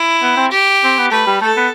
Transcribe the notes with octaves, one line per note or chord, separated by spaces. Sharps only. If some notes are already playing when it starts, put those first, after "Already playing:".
Already playing: E4
B3
C4
G4
C4
B3
A3 B4
G3
A3 A4
B3